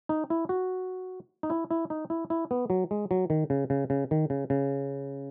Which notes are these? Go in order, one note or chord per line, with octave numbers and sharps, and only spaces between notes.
D#4
E4
F#4
D#4
E4
E4
D#4
E4
E4
B3
F#3
G#3
F#3
D#3
C#3
C#3
C#3
D#3
C#3
C#3